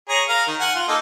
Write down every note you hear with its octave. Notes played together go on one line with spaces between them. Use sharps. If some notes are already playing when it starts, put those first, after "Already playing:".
G#4 C#5 A#5
A#4 F5 A#5
D#3
F#5 G#5
F4
A#3 D#4 A4